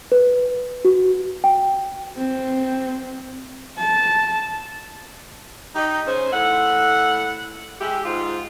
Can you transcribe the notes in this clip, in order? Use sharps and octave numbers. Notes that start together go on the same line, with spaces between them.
B4
F#4
G5
C4
A5
D#4 G4
C#3 C#4 C5
A2 E5 F#5
G#3 E4 G4
G#2 F4